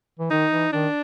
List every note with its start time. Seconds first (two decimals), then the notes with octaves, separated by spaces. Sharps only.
0.19 E3
0.30 D#3 D#4
0.52 E3
0.72 D#3 D4